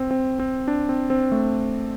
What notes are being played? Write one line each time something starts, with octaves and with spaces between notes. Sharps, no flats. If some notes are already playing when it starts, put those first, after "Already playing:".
Already playing: C4
C4
C4
D4
C4
C4
A3